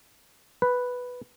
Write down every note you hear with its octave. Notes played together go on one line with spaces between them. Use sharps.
B4